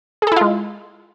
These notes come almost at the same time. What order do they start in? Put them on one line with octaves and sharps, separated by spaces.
G#4 A4 E4 F4 G#3